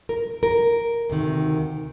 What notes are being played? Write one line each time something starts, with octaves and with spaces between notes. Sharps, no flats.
A#4
A#4
D2 C3 D#3